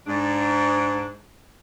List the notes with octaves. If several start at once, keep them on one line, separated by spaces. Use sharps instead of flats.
G#2 D4